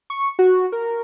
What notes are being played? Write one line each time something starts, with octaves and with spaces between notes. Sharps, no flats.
C#6
F#4
A#4